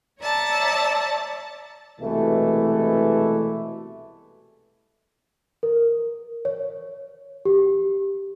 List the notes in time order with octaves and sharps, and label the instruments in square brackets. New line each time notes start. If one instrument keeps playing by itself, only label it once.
[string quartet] C#5 D5 E5 A5 A#5
[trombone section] C2 B2 E3 G#3 A3
[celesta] A#4
C#5
G4